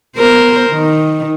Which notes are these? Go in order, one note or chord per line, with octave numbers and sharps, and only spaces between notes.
B3 A#4 C5
D#3